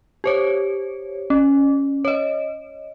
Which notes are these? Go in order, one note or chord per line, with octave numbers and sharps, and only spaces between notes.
G4 C5 C#5
C#4
C#5 D#5